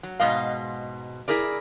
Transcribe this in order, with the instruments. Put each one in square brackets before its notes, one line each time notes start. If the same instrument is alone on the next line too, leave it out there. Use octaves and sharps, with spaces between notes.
[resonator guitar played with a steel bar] F#3
G#2 B2 G#3 D#5 F5
E4 G#4 A#4 D5